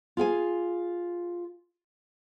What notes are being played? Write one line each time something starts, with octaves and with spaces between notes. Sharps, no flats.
F4 G#4 G5 G#5